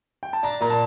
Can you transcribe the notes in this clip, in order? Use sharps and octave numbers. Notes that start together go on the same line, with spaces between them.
G5
A5
D4 A#5
A#2 A#5
A5